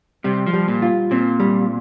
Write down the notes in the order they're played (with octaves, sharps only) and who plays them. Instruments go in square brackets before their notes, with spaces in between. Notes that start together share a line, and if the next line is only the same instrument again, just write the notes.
[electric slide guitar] C3 [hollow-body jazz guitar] G3
[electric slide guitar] F3
[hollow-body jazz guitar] G3
[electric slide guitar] A#2
[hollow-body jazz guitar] F4
[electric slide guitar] A#2 [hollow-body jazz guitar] C4
[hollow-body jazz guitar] G3